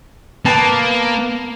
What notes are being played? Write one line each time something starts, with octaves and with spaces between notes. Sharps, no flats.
A#3 B3 A5